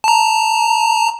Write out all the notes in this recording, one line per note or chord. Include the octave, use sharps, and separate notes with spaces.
A5 A#5